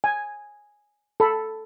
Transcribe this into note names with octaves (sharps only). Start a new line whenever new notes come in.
G#5
A4 B5